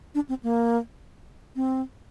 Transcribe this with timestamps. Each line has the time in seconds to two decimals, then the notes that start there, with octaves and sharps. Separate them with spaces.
0.15 D4
0.29 C4
0.43 A#3
1.56 C4